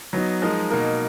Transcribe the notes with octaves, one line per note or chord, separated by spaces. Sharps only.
F#3 B3 D#4
F3 G#3 D#4 A#4
B2 A#3 D#4 A#4